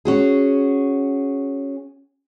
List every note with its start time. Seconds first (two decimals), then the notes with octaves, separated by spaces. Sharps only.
0.05 C#4 F#4 G#4